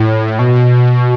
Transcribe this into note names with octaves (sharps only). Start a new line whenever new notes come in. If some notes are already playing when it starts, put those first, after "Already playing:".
Already playing: A2
B2